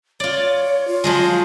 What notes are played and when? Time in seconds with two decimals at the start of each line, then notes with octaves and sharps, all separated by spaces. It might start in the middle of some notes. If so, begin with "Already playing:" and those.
0.20 F4 C#5 D5
0.87 F4
1.04 F3 F#3 G#3